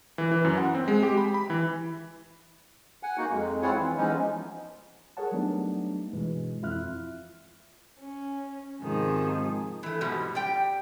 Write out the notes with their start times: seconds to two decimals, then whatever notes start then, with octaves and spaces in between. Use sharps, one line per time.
0.18 E3
0.31 E3
0.45 F#2
0.57 F#5
0.75 C4
0.88 G#3
1.03 G4
1.18 B5
1.34 B5
1.50 E3
3.03 F#5 G#5
3.18 A#3 D#4 F#4
3.31 F2 G#3
3.62 C4 E4 F4 G#4 C#5 F#5
3.77 E3
3.97 E3 F3 G#3 B3 C#4 D#4
5.17 G#4 A#4 C#5 F#5 A5
5.32 F#3 G3 A3 B3 D4 D#4
6.13 G2 B2 E3 G#3
6.63 F2 E4 F4 E5 F6 F#6
7.99 C#4
8.82 G#2 C3 D#3 F3 G#4
9.83 E3 A3
10.01 G#2 B2 F3 G3
10.35 G4 D5 G5